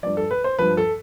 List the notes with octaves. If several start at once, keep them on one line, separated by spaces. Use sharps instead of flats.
G2 F3 D5
A4
B4
C5
G2 F3 B4
A4